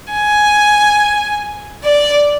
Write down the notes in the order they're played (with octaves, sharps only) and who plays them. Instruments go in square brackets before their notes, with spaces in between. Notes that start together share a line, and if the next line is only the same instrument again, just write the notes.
[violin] G#5
D5